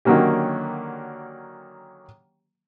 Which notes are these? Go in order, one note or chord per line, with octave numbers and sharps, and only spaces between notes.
D3 D#3 F#3 A#3 C#4 G4